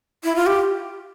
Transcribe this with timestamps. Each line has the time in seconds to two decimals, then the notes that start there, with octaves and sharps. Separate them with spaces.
0.24 E4
0.36 F4
0.46 G4